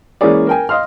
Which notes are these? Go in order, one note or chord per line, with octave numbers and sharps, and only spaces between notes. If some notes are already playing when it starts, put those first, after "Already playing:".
E3 G#3 A#3 C#4 G#4 D5
A#4 G5 G#5
D#5 F5 C6 F6